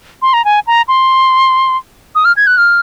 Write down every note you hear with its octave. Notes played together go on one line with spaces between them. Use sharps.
C6
A#5
G#5
A#5
C6
D#6
F6
G#6
F#6
F6